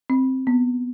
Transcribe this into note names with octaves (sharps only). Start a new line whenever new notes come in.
C4
B3